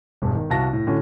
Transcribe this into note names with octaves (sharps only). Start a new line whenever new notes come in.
E1 G2
D#3
C2 F#4 F5 A5 A#6
A2
A2 D3 C#4 F#4